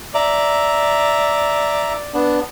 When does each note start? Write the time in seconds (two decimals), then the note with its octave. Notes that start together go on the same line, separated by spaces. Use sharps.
0.15 D5 E5 A#5
2.14 B3 D4